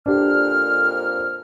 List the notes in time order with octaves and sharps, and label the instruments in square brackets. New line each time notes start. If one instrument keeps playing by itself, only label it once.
[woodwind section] F2 A#2 F6 [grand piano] D4 G4